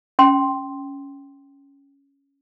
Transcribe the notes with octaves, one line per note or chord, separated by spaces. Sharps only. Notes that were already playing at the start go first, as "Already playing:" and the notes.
C#4 G5 C6